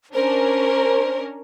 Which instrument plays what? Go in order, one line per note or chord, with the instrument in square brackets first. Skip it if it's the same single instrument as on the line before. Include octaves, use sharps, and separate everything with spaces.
[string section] C#4 D4 A#4 [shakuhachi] C5